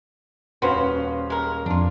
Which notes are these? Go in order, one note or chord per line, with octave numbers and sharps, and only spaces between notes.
D#1 C#4 F#4 B4 C5 F5
G#3 A#4
F2 D4 F4